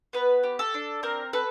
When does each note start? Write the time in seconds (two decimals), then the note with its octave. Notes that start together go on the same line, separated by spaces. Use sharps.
0.13 B3 B4
0.43 G4
0.59 A4
0.74 D4
1.03 C4 A#4
1.33 A4 B4